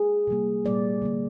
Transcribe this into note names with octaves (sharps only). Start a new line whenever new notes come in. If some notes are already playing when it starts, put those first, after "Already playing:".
Already playing: G#4
C3 G3 A#3
A#2 G3 A#3 D5
D3 G3 A#3